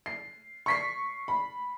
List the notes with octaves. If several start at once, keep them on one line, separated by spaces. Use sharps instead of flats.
C7
C#6 B6 C7
B5